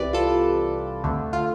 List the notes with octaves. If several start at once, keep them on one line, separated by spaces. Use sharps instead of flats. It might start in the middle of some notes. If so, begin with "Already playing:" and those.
Already playing: C2 C3 E3 B4 D5
F4 A4
D2 D3 A3
F4